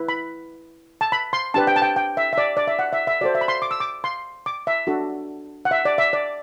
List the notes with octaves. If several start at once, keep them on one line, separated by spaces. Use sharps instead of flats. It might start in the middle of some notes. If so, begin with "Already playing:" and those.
Already playing: E4 B4
B5
A5
B5
C6
D4 G4 B4 A5
G5
A5
G5
G5
E5
E5
D5
D5
E5
F#5
E5
E5
F#4 A4 C5 D5
E5
B5
C6
D6
E6
D6
C6
D6
E5
D4 F#4 A4
F#5
E5
D5
E5
D5